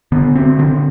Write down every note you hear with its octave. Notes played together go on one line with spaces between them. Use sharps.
D3 B3
C4
D3 C4